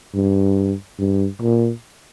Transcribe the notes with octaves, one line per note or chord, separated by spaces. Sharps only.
G2
G2
A#2